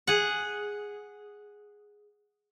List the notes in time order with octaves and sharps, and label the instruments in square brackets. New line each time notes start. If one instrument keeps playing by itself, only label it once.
[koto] G#4 F#5